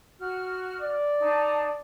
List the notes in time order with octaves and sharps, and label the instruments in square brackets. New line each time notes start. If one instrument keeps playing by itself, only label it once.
[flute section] F#4 F6
[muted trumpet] D5
[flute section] D4 D#4 A5